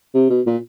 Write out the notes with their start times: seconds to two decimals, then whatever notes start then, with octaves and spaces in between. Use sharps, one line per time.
0.14 C3
0.30 B2
0.46 A#2